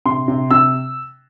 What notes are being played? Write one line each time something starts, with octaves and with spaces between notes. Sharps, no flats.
C3 C6
C3
C3 E6